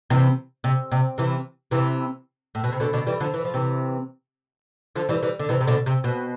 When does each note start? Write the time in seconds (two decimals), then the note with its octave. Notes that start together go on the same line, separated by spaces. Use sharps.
0.10 C3 E3
0.64 C3
0.92 C3
1.18 C3 E3
1.71 C3 E3
2.55 A2
2.64 B2
2.72 C3
2.80 B2 D3
2.93 B2 D3
3.07 E3 G3
3.20 D3 F3
3.34 E3
3.45 F3
3.54 C3 E3
4.95 D3 F3
5.09 E3 G3
5.23 E3 G3
5.39 D3
5.49 C3 E3
5.61 C3
5.67 B2 D3
5.86 C3
6.04 B2